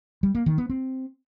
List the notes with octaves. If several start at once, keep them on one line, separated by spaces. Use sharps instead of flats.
G3
A#3
D#3
B3
C4